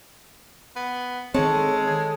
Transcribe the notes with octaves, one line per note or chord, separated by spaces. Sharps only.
B3
D#3 G#3 C4 A4 C#5
G#4